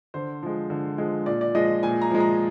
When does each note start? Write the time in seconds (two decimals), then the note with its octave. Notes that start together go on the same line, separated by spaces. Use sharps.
0.14 D3 C5
0.43 F3 G#3
0.70 D3
0.98 F3 G#3
1.26 A#2 D5
1.41 D5
1.55 F3 G#3 D#5
1.83 A#2 G#5
2.02 A#5
2.11 F3 G#3
2.20 A#5